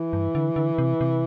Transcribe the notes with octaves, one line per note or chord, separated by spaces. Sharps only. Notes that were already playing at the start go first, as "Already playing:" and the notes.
Already playing: E3
G2
D3
D3
C3
C3